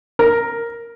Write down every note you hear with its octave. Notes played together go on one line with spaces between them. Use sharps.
A#4